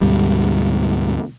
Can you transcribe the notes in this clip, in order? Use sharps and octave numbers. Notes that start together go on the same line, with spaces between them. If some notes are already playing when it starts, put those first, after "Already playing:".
D2 G#2 B2 G3